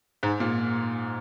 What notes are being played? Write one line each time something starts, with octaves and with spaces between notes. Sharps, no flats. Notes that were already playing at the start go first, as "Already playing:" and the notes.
G#2
A#2